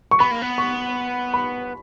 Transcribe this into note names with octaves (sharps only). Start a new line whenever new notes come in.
C#6
B3 B5
A#3
B3
C#6
B5